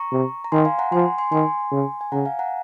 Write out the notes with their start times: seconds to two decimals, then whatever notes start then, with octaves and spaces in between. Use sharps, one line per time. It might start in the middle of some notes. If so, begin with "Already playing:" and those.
Already playing: A#5 C#6
0.12 C3
0.44 A#5
0.52 D#3 G#5 C6
0.65 F5 G#5
0.79 F#5 A#5
0.92 F3 G#5 C6
1.18 G#5 C6
1.32 D#3 G#5 C6
1.72 C#3
2.01 G#5
2.12 C#3 F#5 A#5
2.25 F5 G#5
2.39 F#5 A#5